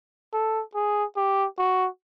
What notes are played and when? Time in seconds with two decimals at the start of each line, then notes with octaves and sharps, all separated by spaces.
0.33 A4
0.75 G#4
1.17 G4
1.58 F#4